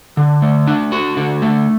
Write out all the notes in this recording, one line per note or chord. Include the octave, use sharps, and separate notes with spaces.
D3
A3
D4
F#4
D3
A3